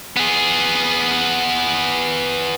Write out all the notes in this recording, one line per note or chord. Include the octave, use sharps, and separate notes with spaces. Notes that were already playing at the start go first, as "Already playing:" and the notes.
B3 G#4